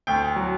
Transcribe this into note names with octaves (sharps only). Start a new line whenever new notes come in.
D2 G5
F#3